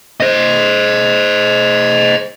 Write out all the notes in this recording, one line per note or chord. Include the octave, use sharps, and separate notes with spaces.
C5 D#5